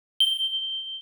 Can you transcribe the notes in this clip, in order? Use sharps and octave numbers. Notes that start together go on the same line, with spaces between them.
G7